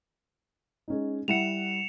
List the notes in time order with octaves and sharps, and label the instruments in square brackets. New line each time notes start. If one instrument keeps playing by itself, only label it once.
[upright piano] G#3 C#4 D#4
[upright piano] G3 E4 F#5 [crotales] C#7 E7 F7